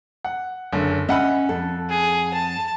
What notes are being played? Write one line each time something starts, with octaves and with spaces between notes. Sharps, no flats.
F#5
F#1 D3
C#4 D#5 E5 F#5 B5
F2 A4
G#4
A5